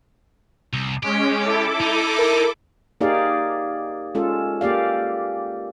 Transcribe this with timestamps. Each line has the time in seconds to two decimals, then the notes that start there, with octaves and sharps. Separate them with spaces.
0.73 C2
1.03 G#3 C#4 G4
1.43 E4 A4 D6
1.81 D#4
2.19 A#4
3.01 A#3 D#4 G4 G#4 D5 F5
4.15 G#3 C#4 F4 A4
4.61 A#3 G4 D5 F5